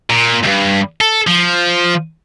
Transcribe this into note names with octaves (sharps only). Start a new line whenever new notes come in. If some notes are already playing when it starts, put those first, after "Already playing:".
A#2
D2 G2
A4
F3